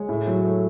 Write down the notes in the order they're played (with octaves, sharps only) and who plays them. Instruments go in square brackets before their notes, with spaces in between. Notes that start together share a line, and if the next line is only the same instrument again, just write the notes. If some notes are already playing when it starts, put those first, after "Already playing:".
Already playing: [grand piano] G#3 C#5
A2
F#3
A3